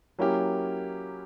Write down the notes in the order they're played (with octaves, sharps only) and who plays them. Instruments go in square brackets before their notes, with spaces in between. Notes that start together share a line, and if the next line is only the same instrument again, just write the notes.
[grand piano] F#3 A#3 C#4 E4 G4